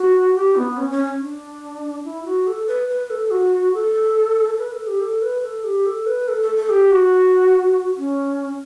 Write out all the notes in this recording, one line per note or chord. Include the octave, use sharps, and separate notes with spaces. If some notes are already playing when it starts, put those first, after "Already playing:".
Already playing: F#4
G4
B3
C#4
C#4
D4
E4
F#4
A4
B4
B4
A4
F#4
A4
B4
A4
G4
A4
B4
A4
G4
A4
B4
A4
A4
A4
G4
F#4
C#4